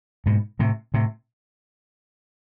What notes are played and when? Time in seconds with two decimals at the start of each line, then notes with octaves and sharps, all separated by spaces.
0.26 G#2 B2
0.59 A2 C3
0.94 A2 C3